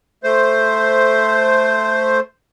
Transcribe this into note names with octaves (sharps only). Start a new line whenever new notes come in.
A3 C5